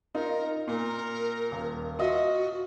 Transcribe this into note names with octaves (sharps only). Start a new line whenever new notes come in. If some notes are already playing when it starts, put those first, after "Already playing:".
D#4 F4 A#4
A#2 A#4
D#1
F4 F#4 D#5 E5